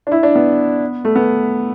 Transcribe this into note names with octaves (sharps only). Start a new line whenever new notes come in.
D4
E4
D4
B3
A3
B3